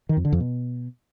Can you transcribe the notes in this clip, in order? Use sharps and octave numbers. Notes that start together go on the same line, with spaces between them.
D#3
F2
D3
F2
B2